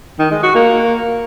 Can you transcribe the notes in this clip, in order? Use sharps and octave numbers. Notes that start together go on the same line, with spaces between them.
D#3
G#3
F#4
A#3